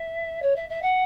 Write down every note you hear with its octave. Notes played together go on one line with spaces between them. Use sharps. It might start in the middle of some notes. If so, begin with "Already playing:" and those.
Already playing: E5
C#5
E5
E5
F#5